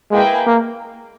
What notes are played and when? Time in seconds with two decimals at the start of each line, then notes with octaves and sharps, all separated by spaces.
0.11 G#3 A#3 E4 G#4 B4 G5
0.47 A#3